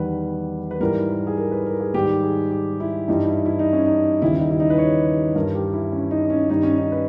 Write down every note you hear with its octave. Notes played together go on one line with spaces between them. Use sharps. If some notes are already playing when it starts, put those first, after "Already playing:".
Already playing: E2 D#3 G3 B4
B4
G#2 E3 G3 A#4
G#4
A#4
B4
A#4
G#4
G#2 D#3 G3 G4
G#4
G4
E4
G2 E3 G3 D#4
E4
E4
D#4
C#4
D#4
D#2 C#3 E3 G3 E4
E4
D#4
E4
D#4
B4
C#5
B4
G2 E3 G3 A#4
G4
E4
C#4
D#4
D#4
C#4
G2 D#3 G3 D#4
C#4
D#4
B4